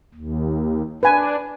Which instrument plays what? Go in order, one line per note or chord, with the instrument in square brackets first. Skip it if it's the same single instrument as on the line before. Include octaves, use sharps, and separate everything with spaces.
[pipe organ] D#2
[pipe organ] D4 [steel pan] B4 G#5